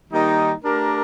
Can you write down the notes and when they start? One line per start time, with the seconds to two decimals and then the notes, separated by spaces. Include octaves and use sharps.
0.10 D#3 G3 A#3 D#4
0.64 A3 D4 G4 A#4